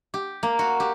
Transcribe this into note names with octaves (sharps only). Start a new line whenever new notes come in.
G4
A#3
F#4
G4